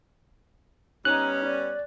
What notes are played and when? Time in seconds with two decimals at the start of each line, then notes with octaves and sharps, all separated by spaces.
1.05 G3 B3 C#4 D#4 F#6
1.44 D5